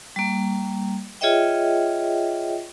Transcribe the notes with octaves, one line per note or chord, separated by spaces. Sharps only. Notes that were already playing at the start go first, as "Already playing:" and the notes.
G3 A#3
F4 G#4 C#5 D#5 E5 G5